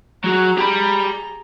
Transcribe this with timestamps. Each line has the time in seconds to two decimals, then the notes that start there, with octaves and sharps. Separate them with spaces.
0.24 F#3 F#4 G#4 A#5
0.58 G4 B5